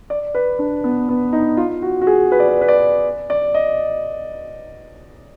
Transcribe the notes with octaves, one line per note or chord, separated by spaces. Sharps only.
D5
B4
D4
B3
B3
D#4
F4
F#4
F#4
G#4
B4
D5
B4
B4
D5
D5
D#5